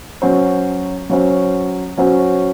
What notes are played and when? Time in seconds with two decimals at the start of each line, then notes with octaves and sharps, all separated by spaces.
0.22 F#3 C#4 F#4 C5
1.10 F#3 C#4 F#4 C5
1.97 F#3 C#4 F#4 C5